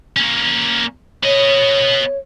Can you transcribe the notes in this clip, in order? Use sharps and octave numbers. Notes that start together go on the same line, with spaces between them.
A#3 C#4
B3 C#5 D#5